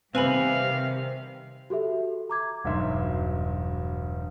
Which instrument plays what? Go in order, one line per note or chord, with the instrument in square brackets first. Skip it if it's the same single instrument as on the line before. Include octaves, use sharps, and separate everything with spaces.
[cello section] C3 D#3 G3 [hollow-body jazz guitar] C4 [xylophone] B4 G#5 B5 [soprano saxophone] F5
[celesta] F#4 G4 A4 E5
A#5 D6 G#6
[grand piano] E1 G2 F#3 D#4 E5 C6